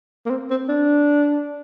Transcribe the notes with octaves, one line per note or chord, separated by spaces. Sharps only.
A#3
C4
C4
D4